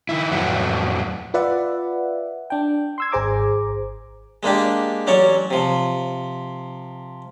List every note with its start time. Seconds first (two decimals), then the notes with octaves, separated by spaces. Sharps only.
0.09 D#3 E4
0.31 F2 A2 F#3 B4 F#5
1.34 F4 B4 D5 E5 F#5
2.50 D4 G5
2.98 C6 E6 G#6
3.12 G#1 G#4 C5 A#5 D6
4.43 G#3 A#3 D4 G4
5.07 A1 F#3 C#4 C#5 D5 C#6
5.51 C3 F3